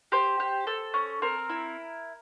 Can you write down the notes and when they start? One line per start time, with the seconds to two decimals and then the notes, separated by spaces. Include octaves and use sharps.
0.12 G4 C5
0.40 G4
0.67 A4
0.94 C#4
1.22 C4 A#4
1.49 E4